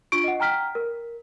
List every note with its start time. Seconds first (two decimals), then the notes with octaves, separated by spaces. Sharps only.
0.12 D4 F4 C#6 D7
0.24 D#5 F#5
0.40 G5 A#5 F6 B6
0.75 A#4